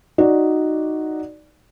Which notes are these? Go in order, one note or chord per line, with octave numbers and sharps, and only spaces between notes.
D#4 F#4 D5